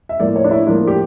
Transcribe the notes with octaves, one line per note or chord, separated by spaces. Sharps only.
E5
A2 F3 A#3 D5
C#5
D4
E4
A2 F3 A#3 D4
G4